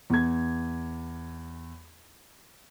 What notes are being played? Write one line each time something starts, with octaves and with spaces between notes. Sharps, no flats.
E2 G#6